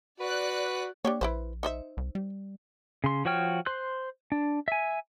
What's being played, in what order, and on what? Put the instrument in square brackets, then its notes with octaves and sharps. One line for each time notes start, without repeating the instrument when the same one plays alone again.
[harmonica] F#4 [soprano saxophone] B4 [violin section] D5 F#6
[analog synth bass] A#3 [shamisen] D4 G4 C#5
[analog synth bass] A#1 [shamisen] E4 B4 C5
[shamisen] D#4 C5 E5
[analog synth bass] C2
G3
[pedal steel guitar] C#3 C6
F3 F#4 C#5 G5 F6
C5 C6 F#6
D4
E5 G#5